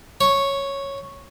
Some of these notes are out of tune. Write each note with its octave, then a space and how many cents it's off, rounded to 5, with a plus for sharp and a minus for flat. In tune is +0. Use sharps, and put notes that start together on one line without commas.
C#5 -5